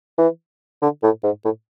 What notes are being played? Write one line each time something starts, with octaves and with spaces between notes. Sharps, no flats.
E3
D3
A2
G#2
A2